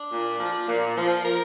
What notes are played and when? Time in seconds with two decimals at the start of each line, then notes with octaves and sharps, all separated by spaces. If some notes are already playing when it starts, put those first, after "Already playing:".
Already playing: D4
0.11 A#2
0.39 F3
0.67 A#2
0.96 F3
1.24 A#4